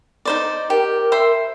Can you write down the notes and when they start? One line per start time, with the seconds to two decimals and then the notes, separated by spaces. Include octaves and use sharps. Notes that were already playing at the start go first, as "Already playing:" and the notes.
0.25 D#4 C5 D5
0.70 G4 A#4
1.12 C5 E5 C6